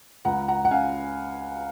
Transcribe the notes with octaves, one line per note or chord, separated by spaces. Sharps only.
C#2 F#5 A#5
F#5 A#5
F#5
C#3 F5 G#5